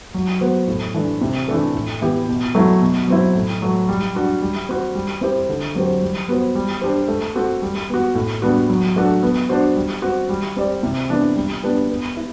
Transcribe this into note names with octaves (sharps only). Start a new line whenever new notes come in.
F#3
B3 F#4 C5
A2
E3 A3 D4
C3
E3 A3 D4 A4
A2
E3 B3 E4 G4
B2
F#3 A3 E4
B2
F#3 C4 E4
A2
F#3 A3
G3
D4 F#4
G3
C4 F#4 C5
G3
C4 E4 G4 C5
D3
F#3 C4 G4 C5
G3
B3 F#4 C5
G3
D4 G4 C5
A3
C4 F#4 A4 C5
G3
B3 F#4
A2
G3 B3 D4 F#4
F#3
A3 D4 F#4 A4
B3
D4 F#4 C5
G3
C4 F#4
G3
C4 G4 D5
C3
E3 B3 D4
G3
B3 D4 G4 B4
B3
E4